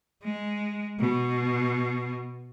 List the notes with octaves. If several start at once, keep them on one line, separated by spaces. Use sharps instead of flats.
G#3
B2